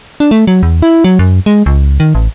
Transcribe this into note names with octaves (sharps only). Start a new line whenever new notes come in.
D4
A3
F#3
E2
E4
F#3
F#2
G#3
C#2
D#3
A1